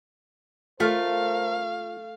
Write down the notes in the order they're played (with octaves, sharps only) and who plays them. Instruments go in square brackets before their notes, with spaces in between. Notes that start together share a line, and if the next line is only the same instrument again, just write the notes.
[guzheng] A3 [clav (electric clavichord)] F4 [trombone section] A4 A#4 C5 [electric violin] F5